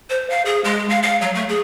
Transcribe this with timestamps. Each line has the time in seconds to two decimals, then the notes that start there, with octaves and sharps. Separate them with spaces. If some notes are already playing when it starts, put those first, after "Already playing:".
0.10 C5
0.30 F5
0.46 G#4
0.64 G#3
0.90 F5
1.03 F5
1.21 F#3
1.35 A3
1.49 G#4